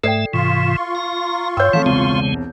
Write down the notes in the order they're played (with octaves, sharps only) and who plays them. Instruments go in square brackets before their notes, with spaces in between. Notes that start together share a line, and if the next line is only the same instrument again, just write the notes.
[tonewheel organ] G#2 A3 E5 [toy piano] A4 D5 G5 [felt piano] C7
[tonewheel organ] G#2 C3 E3 [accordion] F4 C6 C#6
[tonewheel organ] A#5
[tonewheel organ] G2 [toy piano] C#5 G5 [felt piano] E6 G6
[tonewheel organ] E3 F#5 [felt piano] F3 A3 C4
[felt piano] E1 C2 [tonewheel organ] C#3 G#3 C4